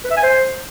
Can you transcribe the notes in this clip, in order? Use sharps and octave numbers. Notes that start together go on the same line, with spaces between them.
B4
E5
G#5
C5